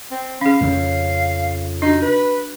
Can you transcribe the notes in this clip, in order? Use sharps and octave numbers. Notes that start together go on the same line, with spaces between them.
C4
C#4 G#4 F5
F2 C#3
D4 D#4 F#4
B4